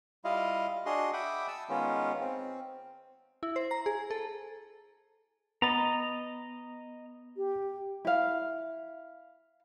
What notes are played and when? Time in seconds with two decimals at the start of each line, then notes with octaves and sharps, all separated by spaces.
0.25 G3 E4 F4 D#5 F5
0.86 D4 F#4 G#4 D#5 C6
1.13 E5 F#5 G5 B5 D6 D#6
1.48 A5 E6
1.69 D#3 G#3 B3 C#4 F4
2.21 C4
3.43 E4
3.56 C5
3.71 A#5
3.86 G#4
4.11 A4
5.62 B3 D#5 A#5 B5 A6
7.36 G4
8.05 E4 F5